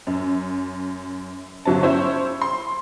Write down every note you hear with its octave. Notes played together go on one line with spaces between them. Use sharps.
F#2
G1 F#3 C#4 A5
C#4 E4 C5 C#5
C6